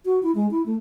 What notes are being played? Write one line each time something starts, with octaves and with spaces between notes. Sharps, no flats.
F#4
E4
G#3
E4
A3